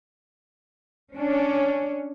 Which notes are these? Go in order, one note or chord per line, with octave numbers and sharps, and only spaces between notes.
C#4 D4